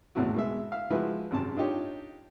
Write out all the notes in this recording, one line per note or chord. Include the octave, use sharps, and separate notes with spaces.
G#1 E2 A2 C3 E4 F#4
B2 G#3 E5
E5 F5
F3 G#3 E4 F#4 B4 E5
G#1 F#2 C3 A5
D4 D#4 F4 G4 C#5